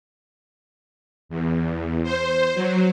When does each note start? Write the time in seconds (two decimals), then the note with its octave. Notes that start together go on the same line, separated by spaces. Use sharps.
1.29 E2
2.03 C5
2.54 F#3